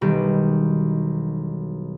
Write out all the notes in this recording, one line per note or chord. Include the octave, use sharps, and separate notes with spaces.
E1 B1 D#3 G3 G4